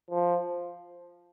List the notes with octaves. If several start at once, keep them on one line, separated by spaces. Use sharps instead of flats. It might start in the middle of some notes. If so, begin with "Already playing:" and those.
F3